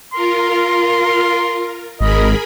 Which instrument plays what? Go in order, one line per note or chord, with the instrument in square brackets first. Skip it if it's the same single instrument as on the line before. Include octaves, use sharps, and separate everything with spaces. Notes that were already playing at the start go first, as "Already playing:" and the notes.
[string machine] F4 A#4 [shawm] C6
[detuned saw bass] G#1 [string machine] G#4 A#4 B5 [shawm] D#5